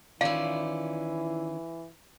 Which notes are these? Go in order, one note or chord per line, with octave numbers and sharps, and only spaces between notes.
D#3 E3 C#4 E4 F4 D5 F5